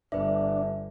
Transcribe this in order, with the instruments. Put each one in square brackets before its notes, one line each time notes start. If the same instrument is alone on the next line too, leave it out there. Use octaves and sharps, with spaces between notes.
[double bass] G1 [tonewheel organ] D4 [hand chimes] B4 E5